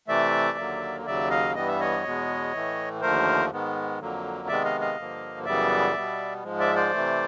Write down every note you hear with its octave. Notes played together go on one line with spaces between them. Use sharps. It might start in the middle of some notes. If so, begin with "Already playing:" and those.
C3 E3 A3 D5 E5
D#2 D3 F#3 A#3
D#2 C#3 F#3 D5 E5
D#5 F5
G2 E3 G3 B3 D#5
E5
C#5 D#5
E2 B2 G#3 B3
A2 E3 A3
D#2 D3 F3 A3 A#4 C5
G#2 D#3 G#3 B3
F2 D3 F#3 A#3
C3 D#3 G#3 B3 D5 E5
D#5 F5
D#5 F5
G2 D3 F3 A#3
F#2 C#3 E3 G3 B3 D5 E5
B2 G3 B3
G#2 F3 G#3
D5 E5
C5 D5
C3 E3 A3